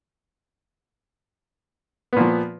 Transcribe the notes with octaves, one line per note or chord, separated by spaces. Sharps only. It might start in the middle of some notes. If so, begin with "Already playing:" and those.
A#2 F3 B3